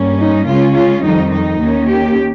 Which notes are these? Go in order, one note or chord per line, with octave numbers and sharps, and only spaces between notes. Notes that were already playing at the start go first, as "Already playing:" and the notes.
Already playing: G2 G3 A#3 C#4
D#4
C#3 G#3 C#4 F4
F4
F2 D#3 G3 D#4
D#4
D#2 D#3 A#3 C#4
G4